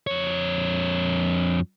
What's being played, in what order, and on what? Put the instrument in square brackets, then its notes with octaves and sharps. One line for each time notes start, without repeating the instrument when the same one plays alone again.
[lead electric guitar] F2 C#5